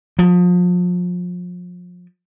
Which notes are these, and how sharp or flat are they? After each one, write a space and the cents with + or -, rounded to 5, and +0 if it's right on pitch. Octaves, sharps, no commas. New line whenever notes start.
F3 +35